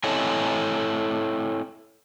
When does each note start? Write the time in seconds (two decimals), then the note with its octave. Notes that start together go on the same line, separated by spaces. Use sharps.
0.04 C4 E4 A4 C#5 D#5 G#5